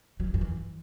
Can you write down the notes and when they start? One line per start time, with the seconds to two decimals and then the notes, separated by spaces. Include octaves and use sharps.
0.20 F#3
0.27 G3
0.34 G2
0.41 E3